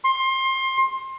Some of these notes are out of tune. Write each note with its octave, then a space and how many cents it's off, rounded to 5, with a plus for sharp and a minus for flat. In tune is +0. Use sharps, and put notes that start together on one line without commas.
C6 +25